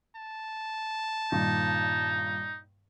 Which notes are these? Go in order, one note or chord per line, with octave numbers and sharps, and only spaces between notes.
A5
G2 A#2 D#3 D#4